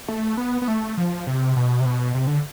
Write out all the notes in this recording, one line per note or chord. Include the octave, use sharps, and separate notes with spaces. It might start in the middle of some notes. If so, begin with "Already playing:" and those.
A3
B3
B3
A3
F3
C3
B2
C3
B2
C3
D3